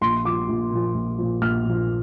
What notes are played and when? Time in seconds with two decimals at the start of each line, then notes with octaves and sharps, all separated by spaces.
0.01 A#1 C6
0.25 A#2 F3 D6
0.49 A#1
0.71 A#2 F3
0.94 A#1
1.18 A#2 F3
1.41 A#1 F6
1.65 A#2 F3